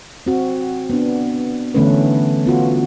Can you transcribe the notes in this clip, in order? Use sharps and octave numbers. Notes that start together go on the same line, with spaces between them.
C4 F#4
B3 D4
D3 E3 A3 B3 C#4 B4
B3 F4 F#4